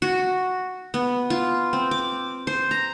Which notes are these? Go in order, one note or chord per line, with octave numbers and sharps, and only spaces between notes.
F#4
B3
F4
C4
D6
C5
A#5